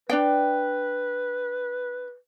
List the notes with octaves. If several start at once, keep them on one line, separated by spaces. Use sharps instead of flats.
D4 B4 D5 G5